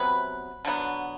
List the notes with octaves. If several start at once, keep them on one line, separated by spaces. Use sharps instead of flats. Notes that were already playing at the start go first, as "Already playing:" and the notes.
Already playing: C3 F#3 B3 B4
D3 F#3 B3